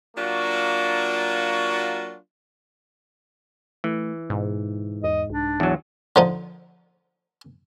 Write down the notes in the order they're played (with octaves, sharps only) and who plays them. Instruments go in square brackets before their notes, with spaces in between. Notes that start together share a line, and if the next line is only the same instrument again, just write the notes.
[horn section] F#3 A#3 D4 F4 F#4
[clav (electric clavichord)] E3 [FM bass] A3
[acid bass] G#2 [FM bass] B2
[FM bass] E2 [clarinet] D#5
[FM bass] C2 [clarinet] D4
[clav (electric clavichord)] E2 F#3
[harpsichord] D3 F3 D#4